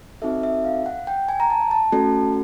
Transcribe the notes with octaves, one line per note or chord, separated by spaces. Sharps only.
C4 D#4 F#4 A4 E5
E5
F5
F#5
G5
G#5
A#5
A5
A5
A3 C#4 F#4 A4